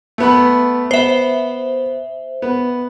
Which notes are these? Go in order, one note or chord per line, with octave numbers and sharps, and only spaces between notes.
A3 B3 B5
B3 C5 E5
B3